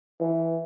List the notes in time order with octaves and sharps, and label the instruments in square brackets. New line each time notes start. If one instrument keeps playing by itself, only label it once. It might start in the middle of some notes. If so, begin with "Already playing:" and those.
[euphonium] E3